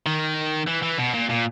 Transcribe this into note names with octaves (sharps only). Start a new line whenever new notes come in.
D#3
E3
E3
B2
A#2
A#2